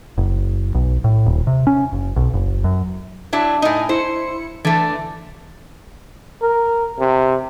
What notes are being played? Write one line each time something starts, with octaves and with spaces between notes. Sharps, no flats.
F#1
B1
A2
D#1
C3
C#4
F#1
B1
F#1
F#2
F#3 D4 E4
A2 D#4 D#5 G#5
E4 C5 C#7
D3 E3 A3 D6
A#4
C3